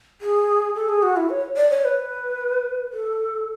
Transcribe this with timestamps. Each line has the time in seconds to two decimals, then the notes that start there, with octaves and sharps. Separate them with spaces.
0.21 G#4
0.75 A4
0.89 G#4
1.03 F#4
1.17 E4
1.30 C#5
1.57 D5
1.70 C#5
1.85 B4
2.93 A4